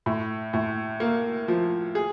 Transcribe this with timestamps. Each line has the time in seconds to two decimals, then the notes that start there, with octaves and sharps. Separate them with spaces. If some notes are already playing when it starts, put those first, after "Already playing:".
0.06 A2
0.53 A2
1.00 A#3
1.48 F3
1.95 G#4